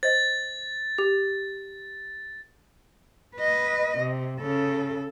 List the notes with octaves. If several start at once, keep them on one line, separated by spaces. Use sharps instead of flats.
C5 D#5 A6
G4
B4 D#5
C3
C#3 A4